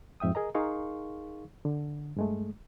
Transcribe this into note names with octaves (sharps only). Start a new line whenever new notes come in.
F2 G#2 E5 G5 D#6
G#4 A#4 D#5 A#5
D#4 G#4 A#4 F5 C6 C#6
D3
G2 G#3 A3